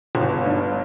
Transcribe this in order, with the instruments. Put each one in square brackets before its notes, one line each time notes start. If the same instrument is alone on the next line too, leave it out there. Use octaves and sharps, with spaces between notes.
[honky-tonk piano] G1
B3
G2